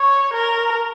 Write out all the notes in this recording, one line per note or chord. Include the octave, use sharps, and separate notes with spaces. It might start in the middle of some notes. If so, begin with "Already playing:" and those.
Already playing: C#5
A#4